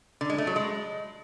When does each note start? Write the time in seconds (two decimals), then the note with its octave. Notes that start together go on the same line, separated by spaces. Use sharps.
0.21 D3
0.30 G#3
0.38 A3
0.47 F#3
0.56 G#3